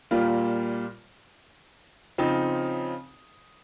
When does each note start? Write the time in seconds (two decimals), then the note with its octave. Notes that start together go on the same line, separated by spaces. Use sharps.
0.11 A#2 G3 A#3 F4
2.18 C#3 F3 C4 D#4